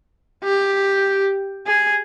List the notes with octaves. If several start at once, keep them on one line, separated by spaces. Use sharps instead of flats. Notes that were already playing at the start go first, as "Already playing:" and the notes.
G4
G#4